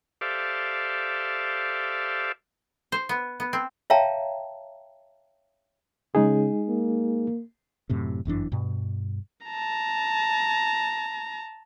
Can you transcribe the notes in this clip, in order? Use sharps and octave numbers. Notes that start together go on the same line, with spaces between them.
G4 A4 C5 D5 E5 F5
C5
B3
B3
C4
C#5 E5 F5 G5 A5 A#5
C#3 G#3 D#4 G#4
A#3
F#2 A2 C3
G1 F#2 E3 D4
G2 B2
A5 A#5